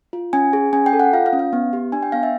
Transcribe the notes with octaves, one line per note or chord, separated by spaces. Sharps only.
F4
C#4 G#5
G#4
C#4 G#5
G5
A4
F#5
F4 F5
F5
C#4
F5
B3
G4
D4 G#5
G5
B3 F5
E5